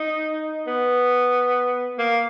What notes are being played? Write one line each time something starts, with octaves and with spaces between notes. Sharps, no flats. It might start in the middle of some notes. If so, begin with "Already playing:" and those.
Already playing: D#4
B3
A#3